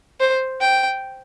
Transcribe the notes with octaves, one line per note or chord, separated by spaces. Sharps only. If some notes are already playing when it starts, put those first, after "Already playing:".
C5
G5